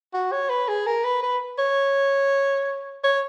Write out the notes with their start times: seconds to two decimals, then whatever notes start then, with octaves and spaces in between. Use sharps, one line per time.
0.14 F#4
0.32 C#5
0.50 B4
0.68 G#4
0.86 A#4
1.04 B4
1.23 B4
1.58 C#5
3.04 C#5